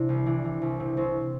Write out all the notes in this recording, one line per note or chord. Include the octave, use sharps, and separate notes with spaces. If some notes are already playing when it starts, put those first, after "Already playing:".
Already playing: C3 E3 D4
C2
E3 D4
E3
C2
C3
C2 C4